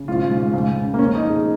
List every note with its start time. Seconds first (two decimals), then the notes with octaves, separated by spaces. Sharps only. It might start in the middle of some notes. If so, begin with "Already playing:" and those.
Already playing: C#3
0.08 G#1 F4
0.31 G#2
0.53 C#2
0.77 C#3
0.94 A#3
0.99 F1 C#4
1.15 D#4
1.23 F2
1.29 G#4